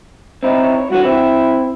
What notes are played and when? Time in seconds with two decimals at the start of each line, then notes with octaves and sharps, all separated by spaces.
0.43 C4 D#4 E4
0.60 C#5
0.90 G2 D3 E3 F#4
1.04 C4 E4